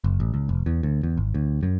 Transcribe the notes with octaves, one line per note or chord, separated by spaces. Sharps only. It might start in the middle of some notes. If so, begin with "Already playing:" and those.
F#1
A1
C#2
F1
E2
D2
E2
G#1
D2
F#2